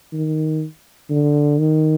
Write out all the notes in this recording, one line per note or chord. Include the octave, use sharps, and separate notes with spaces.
D#3
D3
D#3